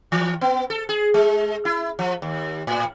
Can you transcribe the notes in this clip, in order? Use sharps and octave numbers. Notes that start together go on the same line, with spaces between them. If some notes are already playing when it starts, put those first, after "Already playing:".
E3
B3
A4
G#4
G#3
E4
F3
D#2
A2